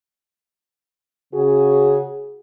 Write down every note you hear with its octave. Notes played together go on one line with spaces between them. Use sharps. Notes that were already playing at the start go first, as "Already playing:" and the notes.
C#3 F#4 G#4